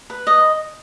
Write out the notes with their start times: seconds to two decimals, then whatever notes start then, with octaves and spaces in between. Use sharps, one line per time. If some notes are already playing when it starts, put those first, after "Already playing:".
0.10 B4
0.27 D#5